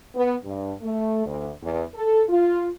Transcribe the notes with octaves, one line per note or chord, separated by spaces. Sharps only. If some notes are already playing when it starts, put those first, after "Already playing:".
B3
G2
A3
D2
E2
A4
F4